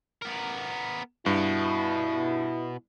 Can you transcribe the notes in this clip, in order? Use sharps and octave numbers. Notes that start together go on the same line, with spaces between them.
B3 A#4
G2 B2 E4